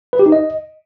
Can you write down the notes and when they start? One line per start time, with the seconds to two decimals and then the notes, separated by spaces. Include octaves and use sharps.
0.13 B4
0.19 G4
0.26 D#4
0.32 D#5